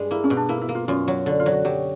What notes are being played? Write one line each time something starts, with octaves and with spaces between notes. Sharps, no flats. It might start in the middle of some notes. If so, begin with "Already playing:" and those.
Already playing: G2 G#3
A#3 E4
C#4
B2
D4
A#3 E4
E4
A#3
F4
F#2 F4
F#3
D3
F4
F#3
F#4
F#3 G4